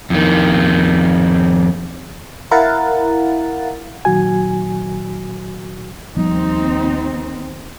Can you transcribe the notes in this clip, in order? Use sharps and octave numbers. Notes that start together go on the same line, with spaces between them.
F2 D#3
E4 A#4 F5 F#5 A6
A#2 D#3 F#3 F#4 G#5
D#2 F3 G3 B3 C4 D#4